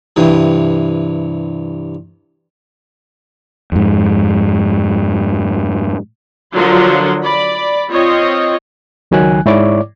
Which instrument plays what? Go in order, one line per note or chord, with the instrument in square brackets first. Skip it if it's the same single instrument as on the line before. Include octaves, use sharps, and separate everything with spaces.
[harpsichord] G2 C3 E3
[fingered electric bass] F2 G#2
[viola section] D3 F3 F#3 F4 A#4 C6
D5 B5
C4 F4 C#5 D#5
[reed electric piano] C#2 D#3 F#3 G#5 F#6
G#2 E4 C#5 D5 D6